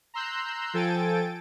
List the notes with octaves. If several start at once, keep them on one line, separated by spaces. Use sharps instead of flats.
A#5 C6 E6 F#6 G6
F3 A4 G5 G#5 A6 D7